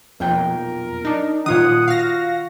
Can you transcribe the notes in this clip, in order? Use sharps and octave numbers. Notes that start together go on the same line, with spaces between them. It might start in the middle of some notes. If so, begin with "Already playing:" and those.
B1 F2 A#2 A#4 G5
D4 D#4
A#2 D#3 F4 C#5 F#5 D#6
F#4 F5 A#6